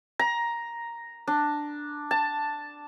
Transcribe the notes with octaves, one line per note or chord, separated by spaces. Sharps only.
A#5
D4
A5